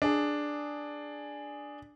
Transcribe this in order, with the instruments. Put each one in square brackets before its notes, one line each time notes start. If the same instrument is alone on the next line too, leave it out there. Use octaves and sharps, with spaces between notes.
[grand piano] D4 G#4